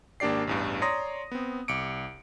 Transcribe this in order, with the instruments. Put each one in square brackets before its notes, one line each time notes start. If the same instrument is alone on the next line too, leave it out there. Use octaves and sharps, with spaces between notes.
[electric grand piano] G#1 A#3 D4 G4 D5 C7
A1 E2 G2
C#5 D5 A#5 C6 D#6 A#6
B3 C4
C2 D6 C#7 D7